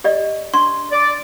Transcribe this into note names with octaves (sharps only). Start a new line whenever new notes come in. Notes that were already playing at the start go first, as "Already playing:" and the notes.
G4 D5 D#5
D4 C6 C#6
D5